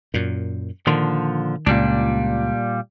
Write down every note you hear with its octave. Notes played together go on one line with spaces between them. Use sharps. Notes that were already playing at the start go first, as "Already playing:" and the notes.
F#2 A#2
A#2 D3 D#3 F3
C#2 A#2 G3 D4